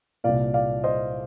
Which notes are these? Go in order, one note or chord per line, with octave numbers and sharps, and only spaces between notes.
C2 A#2 D5 F5
D5 F5
C5 D#5